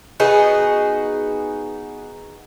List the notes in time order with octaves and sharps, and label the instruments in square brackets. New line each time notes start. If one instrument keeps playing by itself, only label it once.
[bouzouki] B3 D#4 F#4 G#4